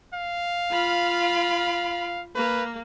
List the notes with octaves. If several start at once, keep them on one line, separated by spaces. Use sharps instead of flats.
F5
F4 B5
A#3 B4